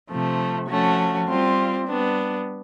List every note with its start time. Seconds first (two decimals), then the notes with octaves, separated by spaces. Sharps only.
0.11 C3 F3 A3
0.69 F3 A3 C#4 F#4
1.28 G3 C4 F4
1.87 G3 B3 D4